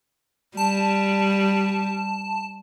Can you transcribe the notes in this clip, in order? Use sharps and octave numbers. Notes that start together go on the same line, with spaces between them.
G3 A5